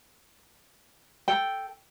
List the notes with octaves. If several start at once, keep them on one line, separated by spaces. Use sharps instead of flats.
A4 G5